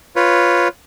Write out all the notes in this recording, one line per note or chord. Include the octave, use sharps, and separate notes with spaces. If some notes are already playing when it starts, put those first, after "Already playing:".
F4 B4 C#5